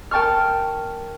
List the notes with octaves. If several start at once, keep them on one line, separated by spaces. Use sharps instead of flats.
A#4 G5 A5 C#6 F6